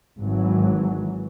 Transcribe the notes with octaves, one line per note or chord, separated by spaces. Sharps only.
G#1 E3 F#3